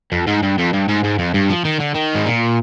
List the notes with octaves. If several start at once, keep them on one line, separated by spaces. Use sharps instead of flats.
F2
G#2
G2
F2
G2
G#2
G#2
F2
G2
F3
D#3
D3
D#3
G#2
A#2